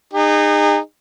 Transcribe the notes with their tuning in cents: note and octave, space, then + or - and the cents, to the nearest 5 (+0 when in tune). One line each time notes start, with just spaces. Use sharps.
D#4 -25 G#4 -40